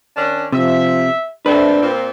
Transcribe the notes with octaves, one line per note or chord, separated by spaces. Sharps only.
D#3 C#4 D4
C3 F3 E5
A3 C4 D4 B4
A#2 C4